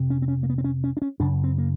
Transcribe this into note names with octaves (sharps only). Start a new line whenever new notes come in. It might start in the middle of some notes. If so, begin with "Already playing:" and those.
Already playing: F2 C3
C#4
C4
C#4
A#3
B3
C4
C#4
C#4
D4
C#4
F#2 C#3 D4
C4
A#3